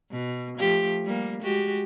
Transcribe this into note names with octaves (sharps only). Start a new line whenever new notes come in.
B2
F3 A3 G4
G3 A#3
G#3 F#4 G4